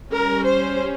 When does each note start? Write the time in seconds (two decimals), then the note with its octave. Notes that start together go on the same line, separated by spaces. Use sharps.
0.12 G3 C#4 A#4
0.45 C5